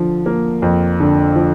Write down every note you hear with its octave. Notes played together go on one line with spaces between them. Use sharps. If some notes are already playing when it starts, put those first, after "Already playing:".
Already playing: D3 F3
A#3
F2
D3
F3